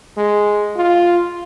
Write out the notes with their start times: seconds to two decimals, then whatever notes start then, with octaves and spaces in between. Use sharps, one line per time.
0.17 G#3
0.76 F4